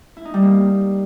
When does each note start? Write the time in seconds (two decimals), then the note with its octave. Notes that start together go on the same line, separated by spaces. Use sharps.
0.17 E4
0.25 D#4
0.34 G3
0.42 A#3